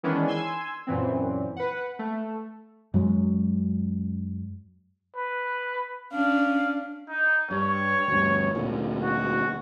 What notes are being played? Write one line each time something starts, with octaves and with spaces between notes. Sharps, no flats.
D#3 E3 G#3 B3 C#4 D4
G#5 C6 E6 G#6
F#2 A#2 E3 C4
B4 F#5
A3
F#2 F#3 G#3
B4
C#4 D4 F5
D#4
G2 C#5
D2 G2
D2 A#2
F#4